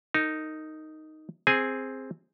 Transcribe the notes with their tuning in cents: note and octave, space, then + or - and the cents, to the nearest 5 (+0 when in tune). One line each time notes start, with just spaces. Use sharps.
D#4 +0 A#4 -35
C4 +0 G#4 +0 G#5 +0